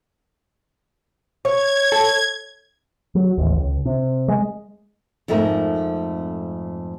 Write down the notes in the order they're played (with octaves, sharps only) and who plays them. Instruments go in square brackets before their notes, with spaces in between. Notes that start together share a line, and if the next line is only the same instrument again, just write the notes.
[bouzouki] C#5 [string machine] G#6
[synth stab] A4
[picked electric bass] F#3
A1 D#2
C#2
C3
G#3
[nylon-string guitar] F2 G#2 A3 C4 A#4